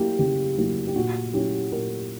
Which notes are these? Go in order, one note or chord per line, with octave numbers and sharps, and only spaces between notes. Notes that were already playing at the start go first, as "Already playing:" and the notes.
Already playing: F#3 A#3 E4 G4
C#3 G4
F#3 A#3 E4
G4
A#2 F#4
F#3 C#4 E4 G4
A#2 A#4